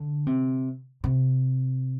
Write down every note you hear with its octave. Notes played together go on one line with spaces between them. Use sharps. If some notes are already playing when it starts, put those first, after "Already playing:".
Already playing: D3
C3
C3